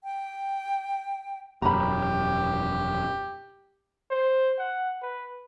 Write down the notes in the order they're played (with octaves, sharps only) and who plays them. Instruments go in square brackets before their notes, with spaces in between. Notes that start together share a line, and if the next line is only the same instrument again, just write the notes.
[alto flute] G5
[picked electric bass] E1 F#2 [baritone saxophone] G4 [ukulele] A#5 B5
[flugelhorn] C5
F#5
B4